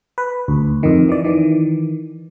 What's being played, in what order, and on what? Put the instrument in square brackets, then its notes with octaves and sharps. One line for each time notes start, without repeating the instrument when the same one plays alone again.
[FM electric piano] B4
D2
F2 D#3
E3 D5
D#3 E3